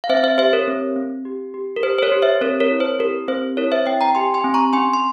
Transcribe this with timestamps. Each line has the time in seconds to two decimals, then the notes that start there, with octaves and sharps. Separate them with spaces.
0.04 F5
0.09 C4 C5 E5
0.17 F5
0.24 C5 E5
0.38 G4 C5 E5
0.53 A#4 C#5
0.68 C4
0.96 C4
1.25 G4
1.54 G4
1.76 A#4
1.83 G4 C5
1.98 C5
2.02 A#4 C#5
2.12 G4
2.22 C5 E5
2.41 C4 A#4 C#5
2.60 A#4 C#5
2.71 E4
2.80 C5
2.99 G4 A#4
3.28 C4 C5
3.57 E4 A#4 C#5
3.72 C5 E5
3.86 C4 E5 G5
4.01 G5 A#5
4.15 G4 G#5 C6
4.34 G#5 C6
4.44 C4
4.54 A#5 C#6
4.73 C#4 G#5 C6
4.93 C6